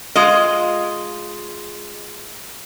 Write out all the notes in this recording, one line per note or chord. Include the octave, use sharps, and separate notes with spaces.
G#3 F4 D#5